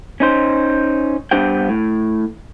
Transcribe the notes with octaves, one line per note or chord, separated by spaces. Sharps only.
C#4 D#4 C5
G2 B3 D4 G4 C5 G5
A2